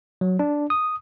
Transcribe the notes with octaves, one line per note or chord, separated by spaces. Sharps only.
F#3
D4
D#6